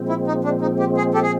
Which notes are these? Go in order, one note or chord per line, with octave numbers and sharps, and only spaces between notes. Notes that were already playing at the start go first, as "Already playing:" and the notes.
Already playing: A#2 F3 G#3 C4
E4
D#4
D4
D#4
G4
G#4
G4 A4
G#4